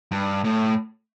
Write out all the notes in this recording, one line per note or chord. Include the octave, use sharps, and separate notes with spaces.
G2
A2